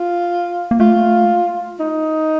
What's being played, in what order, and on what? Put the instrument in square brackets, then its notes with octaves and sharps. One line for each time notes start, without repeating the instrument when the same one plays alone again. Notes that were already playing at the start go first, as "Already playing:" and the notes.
Already playing: [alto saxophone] F4
[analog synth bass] A#3
[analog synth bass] A3 [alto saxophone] F4
[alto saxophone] D#4